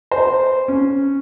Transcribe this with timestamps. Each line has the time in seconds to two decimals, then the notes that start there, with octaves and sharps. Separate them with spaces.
0.11 C5
0.68 C#4